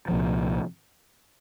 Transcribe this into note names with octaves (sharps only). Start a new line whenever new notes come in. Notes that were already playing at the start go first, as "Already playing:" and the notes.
C2 A#2 F3